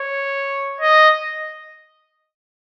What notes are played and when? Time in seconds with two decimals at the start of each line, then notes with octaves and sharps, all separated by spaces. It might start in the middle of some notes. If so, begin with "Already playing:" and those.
Already playing: C#5
0.81 D#5